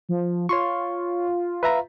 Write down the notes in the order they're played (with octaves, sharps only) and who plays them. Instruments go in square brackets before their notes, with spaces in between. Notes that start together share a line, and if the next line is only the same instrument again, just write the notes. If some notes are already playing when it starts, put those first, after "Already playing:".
[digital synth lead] F3
[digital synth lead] F4 [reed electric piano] C#5 C6 C#6
[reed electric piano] B4 E5 A#5